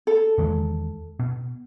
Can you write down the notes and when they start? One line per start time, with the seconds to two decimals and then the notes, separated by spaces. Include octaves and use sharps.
0.07 A4
0.38 E2 D#3 G#3
1.20 B2